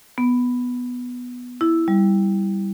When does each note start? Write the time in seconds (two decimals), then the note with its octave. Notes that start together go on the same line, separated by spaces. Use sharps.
0.18 B3
1.61 E4
1.88 G3